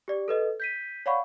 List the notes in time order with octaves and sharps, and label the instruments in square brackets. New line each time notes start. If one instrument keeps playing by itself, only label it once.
[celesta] G4 D5
A4 B4 D#5
G6 B6 D#7
C#5 D5 F5 F#5 B5 C#6